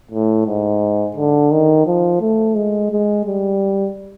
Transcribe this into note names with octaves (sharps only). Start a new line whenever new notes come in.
A2
G#2
D3
D#3
F3
A3
G#3
G#3
G3